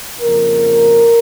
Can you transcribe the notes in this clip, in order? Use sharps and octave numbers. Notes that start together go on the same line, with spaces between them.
F2 C#3 F3 A#3 A#4